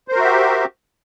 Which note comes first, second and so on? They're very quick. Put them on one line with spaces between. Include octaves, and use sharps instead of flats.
C5 A#4 F#4 E5 G4